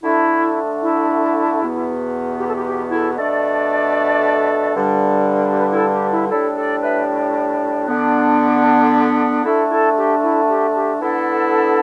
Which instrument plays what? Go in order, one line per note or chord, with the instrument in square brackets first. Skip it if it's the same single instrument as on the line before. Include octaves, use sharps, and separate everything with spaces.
[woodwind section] D3 A3 D4 E4
E4
E2 B2 B3
G4
A4
G4
G4
E4 A4
B2 A3 D4 A4 D5
G2 D3 G3 D4
G4 B4
E4 A4
G4
E4
A2 G3 D4 E4 A4
A4 D5
B4 E5
D3 B3 D4
D3 A3 D4 E4 A4
E4 A4
G4
E4
G4
G4
D3 B3 D4 E4 A4